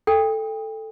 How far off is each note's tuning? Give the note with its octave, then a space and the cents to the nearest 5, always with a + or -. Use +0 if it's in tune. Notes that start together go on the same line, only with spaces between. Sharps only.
A4 +0 G5 +30